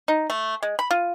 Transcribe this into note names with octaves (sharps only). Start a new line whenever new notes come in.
D#4
A3
G#3
B5
F4